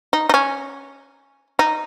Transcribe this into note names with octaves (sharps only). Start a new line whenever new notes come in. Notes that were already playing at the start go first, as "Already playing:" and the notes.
D#4
D#4
C#4
D#4